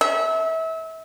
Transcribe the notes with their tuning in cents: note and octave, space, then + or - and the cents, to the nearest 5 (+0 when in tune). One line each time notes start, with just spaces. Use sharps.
E5 -30